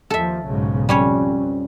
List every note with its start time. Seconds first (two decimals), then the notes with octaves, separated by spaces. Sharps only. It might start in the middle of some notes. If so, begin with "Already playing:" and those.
0.10 D#2 F3 A4 E5
0.46 B1 G#2 C#3
0.89 F2 G3 C#4 C#5